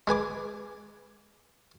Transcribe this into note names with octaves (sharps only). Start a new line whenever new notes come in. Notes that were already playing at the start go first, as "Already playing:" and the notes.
G#3 B4 G#5 D6